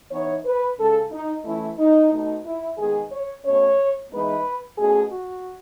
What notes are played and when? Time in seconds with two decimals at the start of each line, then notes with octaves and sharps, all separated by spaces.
0.12 E3 B3 D#4 C#5
0.45 B4
0.78 C#3 G#3 C#4 A4
1.12 D#4
1.45 E3 A3 C#4 E4
1.79 D#4
2.12 B2 A3 D#4
2.45 E4
2.78 D#3 G#3 B3 G#4
3.12 C#5
3.45 B2 A3 C#4 C#5
4.12 E3 G#3 B3 D#4 B4
4.78 B2 A3 C#4 G#4
5.12 F#4